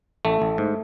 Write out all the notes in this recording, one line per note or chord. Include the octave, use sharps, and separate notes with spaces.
A1 A3
A1
G#2